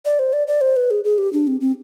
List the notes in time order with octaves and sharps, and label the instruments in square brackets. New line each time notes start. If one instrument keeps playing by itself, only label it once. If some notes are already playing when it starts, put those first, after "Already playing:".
[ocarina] D5
C5
D5
D5
C5
B4
G#4
G#4
G4
D4
C4
C4